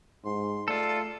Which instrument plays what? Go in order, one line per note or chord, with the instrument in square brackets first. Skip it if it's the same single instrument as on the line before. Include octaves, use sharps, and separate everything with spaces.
[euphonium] G#2 [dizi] C6
[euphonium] A3 [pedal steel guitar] F4 A4 [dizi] D5